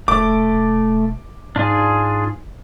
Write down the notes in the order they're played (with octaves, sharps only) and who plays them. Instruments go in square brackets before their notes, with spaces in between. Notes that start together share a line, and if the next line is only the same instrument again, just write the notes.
[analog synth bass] E1 [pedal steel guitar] A3 [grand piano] D6
[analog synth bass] G#2 [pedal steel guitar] D4 F4 G#4